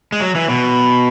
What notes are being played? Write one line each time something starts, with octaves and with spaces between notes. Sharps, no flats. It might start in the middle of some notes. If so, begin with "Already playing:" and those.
G#3
F#3
E3
B2